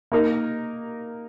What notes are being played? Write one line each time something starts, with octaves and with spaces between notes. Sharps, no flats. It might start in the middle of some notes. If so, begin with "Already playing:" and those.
A#3 D#4 A#4